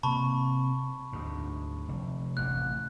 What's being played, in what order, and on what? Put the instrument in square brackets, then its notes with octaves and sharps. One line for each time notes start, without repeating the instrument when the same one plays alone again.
[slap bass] C3 A#3 [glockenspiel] A5 B5 C#6
[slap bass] D2 G#2
F1
[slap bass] A1 C3 [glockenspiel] F#6